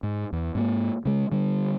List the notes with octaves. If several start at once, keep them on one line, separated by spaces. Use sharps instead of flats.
G#2
E2
G#2 A3 A#3
C#3 G#3
D3 G3